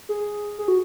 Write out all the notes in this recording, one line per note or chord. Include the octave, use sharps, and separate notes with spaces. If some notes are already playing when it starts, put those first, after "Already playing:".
G#4
G#4
F#4